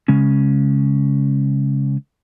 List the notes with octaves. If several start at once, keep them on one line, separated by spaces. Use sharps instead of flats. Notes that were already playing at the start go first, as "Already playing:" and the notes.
C#3 G#3 C#4